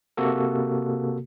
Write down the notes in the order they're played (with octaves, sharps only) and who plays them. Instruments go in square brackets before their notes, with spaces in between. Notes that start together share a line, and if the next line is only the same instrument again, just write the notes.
[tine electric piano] C3 A#3 F#4 A4